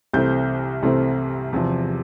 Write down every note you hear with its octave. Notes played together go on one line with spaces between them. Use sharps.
C2 C3 E3 A3 C4 G6
C2 C3 E3 A3 C4
E2 C3 F3